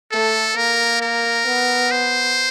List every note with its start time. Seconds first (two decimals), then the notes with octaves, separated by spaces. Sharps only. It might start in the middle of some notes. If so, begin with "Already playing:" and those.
0.11 A3 A4
0.57 A#3 A#4
1.02 A#4
1.46 B3
1.91 C5